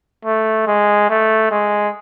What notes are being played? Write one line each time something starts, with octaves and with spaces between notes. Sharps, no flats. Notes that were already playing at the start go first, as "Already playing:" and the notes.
A3
G#3
A3
G#3